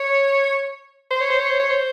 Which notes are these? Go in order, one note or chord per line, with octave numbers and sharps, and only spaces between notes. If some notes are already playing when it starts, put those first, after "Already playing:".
Already playing: C#5
C5
C#5
C5
C#5
C5
C#5
C5